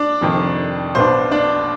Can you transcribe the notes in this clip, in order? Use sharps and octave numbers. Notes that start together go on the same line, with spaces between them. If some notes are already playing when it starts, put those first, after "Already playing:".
Already playing: D4 D5
F1 F2 D#3
B1 B2 B3 D4 C5
D4 D5